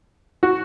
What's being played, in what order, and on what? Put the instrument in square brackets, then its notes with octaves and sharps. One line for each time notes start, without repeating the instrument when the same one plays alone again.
[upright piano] F#4